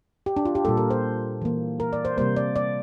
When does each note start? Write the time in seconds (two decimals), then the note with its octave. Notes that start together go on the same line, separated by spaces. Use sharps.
0.26 G4
0.37 D4
0.45 F4
0.55 G4
0.64 A#2 G3 A#3 A4
0.77 A#4
0.90 C5
1.42 E3 A#3
1.80 A#4
1.93 D5
2.05 C5
2.18 C3 G3 A#3 C5
2.36 D5
2.56 D5